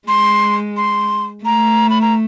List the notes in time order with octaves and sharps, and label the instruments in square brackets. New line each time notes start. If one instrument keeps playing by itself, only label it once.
[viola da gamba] G#3 [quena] C6
[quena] C6
[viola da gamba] A3 [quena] A#5
[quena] B5
A#5